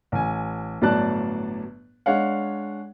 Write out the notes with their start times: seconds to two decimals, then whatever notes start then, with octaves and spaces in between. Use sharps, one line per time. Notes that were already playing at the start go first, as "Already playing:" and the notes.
0.12 A1 G#5
0.82 G1 A2 F#3 D5 A5 F#6
2.06 G#3 D4 C#5 F5 F#5